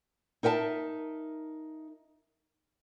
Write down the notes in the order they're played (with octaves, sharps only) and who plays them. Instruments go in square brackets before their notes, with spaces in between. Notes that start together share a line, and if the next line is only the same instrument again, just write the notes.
[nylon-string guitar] D#4 A#4 E5 G5 A5